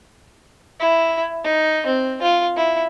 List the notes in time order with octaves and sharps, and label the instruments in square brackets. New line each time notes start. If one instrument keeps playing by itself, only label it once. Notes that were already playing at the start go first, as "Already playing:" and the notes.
[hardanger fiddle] E4
D#4
C4
F4
E4